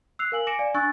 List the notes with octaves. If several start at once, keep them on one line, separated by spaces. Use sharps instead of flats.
E6 F#6 C7 F7
A#4 F5 G#5 F#7
G#5 D6 A#6 C#7 D7 E7
D5 F5 G#5
D4 G#5 C#6 E6 F#6 A6